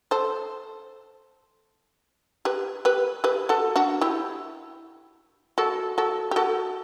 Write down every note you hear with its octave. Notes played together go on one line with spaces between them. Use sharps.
A4 C5
G4 B4
G4 B4
G4 B4
F#4 A4
D4 F#4
E4 G4
F#4 A4
F#4 A4
G4
F#4 A4